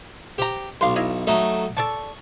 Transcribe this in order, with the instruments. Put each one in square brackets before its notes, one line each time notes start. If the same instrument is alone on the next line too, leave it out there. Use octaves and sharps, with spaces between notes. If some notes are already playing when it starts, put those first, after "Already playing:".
[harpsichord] G4 [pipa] C5 A#5
[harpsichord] B1 [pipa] F5 C6
[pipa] E4 D#5 F5
[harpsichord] F#3 A3 D#4
[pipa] A4 D5 A5 [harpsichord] C#6